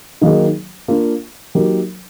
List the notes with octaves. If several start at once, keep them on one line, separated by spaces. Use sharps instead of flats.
D#3 F#3 A#3 D#4 G#4
A#3 D4 F4
F#3 A#3 D#4 G4 A#4